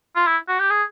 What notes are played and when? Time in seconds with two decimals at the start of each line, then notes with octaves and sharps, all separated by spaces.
0.16 F4
0.27 E4
0.48 F#4
0.60 G4
0.70 G#4